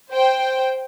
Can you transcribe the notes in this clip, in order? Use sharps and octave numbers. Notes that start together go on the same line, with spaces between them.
C5 G5